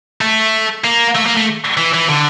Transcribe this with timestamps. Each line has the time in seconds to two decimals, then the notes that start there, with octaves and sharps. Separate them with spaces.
0.21 A3
0.84 A#3
1.15 A3
1.26 A#3
1.36 A3
1.77 E3
1.94 E3
2.09 D3